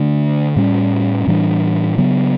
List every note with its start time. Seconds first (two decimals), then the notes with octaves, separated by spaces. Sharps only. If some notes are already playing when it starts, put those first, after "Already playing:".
Already playing: D3 A3 D4
0.56 A2 G3 C#4
1.27 A2 E3 G3 D4
1.98 C#3 F#3 B3